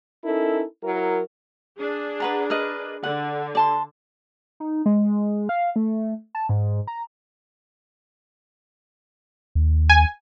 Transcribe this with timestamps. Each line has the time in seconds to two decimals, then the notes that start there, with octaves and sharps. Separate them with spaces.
0.24 C#4 D#4 E4 A4 A#4
0.83 F#3 E4 A#4
1.79 D4 G#4
2.20 B4 F#5 A#5
2.50 A#4 B4 D#5
3.03 D3 F#5
3.55 D5 A5 C6
4.60 D#4
4.86 G#3
5.49 F5
5.76 A3
6.35 A5
6.49 G#2
6.87 A#5
9.55 D#2
9.90 G#5